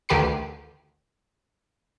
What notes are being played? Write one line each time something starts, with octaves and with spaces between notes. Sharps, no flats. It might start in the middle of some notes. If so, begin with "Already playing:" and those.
D2 D#3 G4 B4 C7